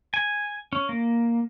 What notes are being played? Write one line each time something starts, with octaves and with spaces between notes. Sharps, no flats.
G#5
C#4
A#3